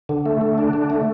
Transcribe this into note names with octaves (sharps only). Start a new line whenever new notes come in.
D3
A3
D3
D4
D3
A3